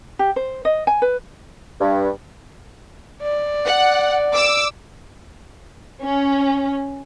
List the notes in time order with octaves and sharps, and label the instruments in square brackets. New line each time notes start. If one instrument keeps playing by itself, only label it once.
[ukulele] G4
C5
D#5
G#5
B4
[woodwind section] G2
[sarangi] D5
[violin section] F#5
D6 E6
C#4